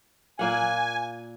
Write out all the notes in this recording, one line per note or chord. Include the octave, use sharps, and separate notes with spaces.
A#2 A#3 F#5 G#5